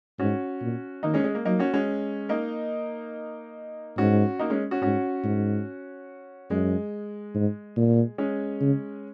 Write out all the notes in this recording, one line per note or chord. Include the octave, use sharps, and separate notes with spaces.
G#2 C#4 F#4
A#2
D#3 A#3 D#4
G#3 C#4
G#3
A#3
F#3 A#3 D#4
C#4 F#4
G#3 C#4
A#3 D#4
G#2 C#4 F#4
A#3 D#4
G#3 C#4
C#4 F#4
G#2 C#4 F#4
G#2
F#2 G#3
G#2
A#2
G#3 C#4
C#3